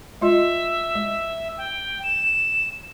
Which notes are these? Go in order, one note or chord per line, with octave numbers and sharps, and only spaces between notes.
G#3 F4 D#5 E5
G#3
G5
E7